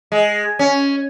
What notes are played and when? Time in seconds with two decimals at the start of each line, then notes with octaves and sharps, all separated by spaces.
0.12 G#3
0.59 C#4